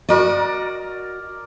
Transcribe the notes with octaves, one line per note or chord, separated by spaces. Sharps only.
F#4 A#4 D5 D#5